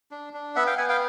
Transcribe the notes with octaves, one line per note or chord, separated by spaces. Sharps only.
D4
D4
B3 E5 F#5
F5 G5
B3 F#5 G#5
F5 G5